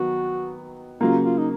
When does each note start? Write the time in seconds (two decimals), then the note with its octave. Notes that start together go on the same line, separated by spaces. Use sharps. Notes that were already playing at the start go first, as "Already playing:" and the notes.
Already playing: D#3 F#3 B3 F#4
1.01 C#3 F#3 A#3 F4
1.24 F4
1.38 D#4